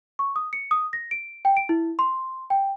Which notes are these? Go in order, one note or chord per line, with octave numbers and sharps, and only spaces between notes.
C#6
D#6
C#7
D#6
A#6
D7
G5
D7
E4
C6
G5